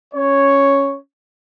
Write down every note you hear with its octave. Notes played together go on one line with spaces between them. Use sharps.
C#4 C#5